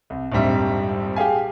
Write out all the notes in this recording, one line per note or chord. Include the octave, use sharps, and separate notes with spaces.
C2
A#1 F2 G#2 G3 E5
G4 G#4 F5 G#5